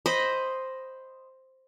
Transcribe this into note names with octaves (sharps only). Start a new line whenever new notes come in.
C5 D#5 B5